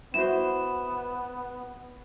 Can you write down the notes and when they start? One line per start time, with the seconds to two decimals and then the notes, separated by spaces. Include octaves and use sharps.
0.14 B3 E4 F#4 C5 E7